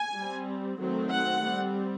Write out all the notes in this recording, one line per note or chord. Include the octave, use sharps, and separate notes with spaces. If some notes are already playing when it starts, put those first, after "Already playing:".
Already playing: G#5
G3 C4
D#3 F#3 A3 C4
F#5
G3 C4